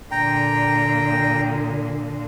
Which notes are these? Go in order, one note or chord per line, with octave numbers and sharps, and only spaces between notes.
A#2 D3 G5 A#5